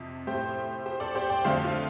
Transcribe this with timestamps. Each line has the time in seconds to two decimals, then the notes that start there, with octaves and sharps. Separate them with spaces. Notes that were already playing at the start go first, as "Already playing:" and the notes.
Already playing: F2 C3
0.27 A2 A3 G4 C5
0.86 G4 C5
1.00 A4 D5
1.15 G4 C5
1.30 D5 G5
1.44 F2 D3 A3 C5 F5
1.64 F4